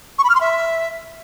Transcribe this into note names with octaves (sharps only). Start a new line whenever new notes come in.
C#6
B5
F6
C6
E5